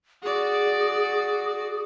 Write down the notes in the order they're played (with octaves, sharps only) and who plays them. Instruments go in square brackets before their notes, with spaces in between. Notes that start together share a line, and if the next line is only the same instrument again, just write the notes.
[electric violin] F#4 D5 [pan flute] G#4